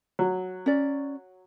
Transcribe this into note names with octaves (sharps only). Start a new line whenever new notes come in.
F#3
C#4 D5